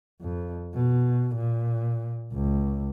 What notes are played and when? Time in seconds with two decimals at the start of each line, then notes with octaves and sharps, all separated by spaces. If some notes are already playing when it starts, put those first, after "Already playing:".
0.21 F2
0.74 B2
1.36 A#2
2.33 C#2